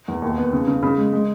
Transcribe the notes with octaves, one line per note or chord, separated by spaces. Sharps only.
E2
D#2
B3
C#3
C#3
C#3 B5
G#3
G#3